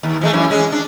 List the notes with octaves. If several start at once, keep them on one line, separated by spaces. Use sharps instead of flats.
D#2
F3 G#3 A3
F#2 E3 C#4
G#3 C#4
D4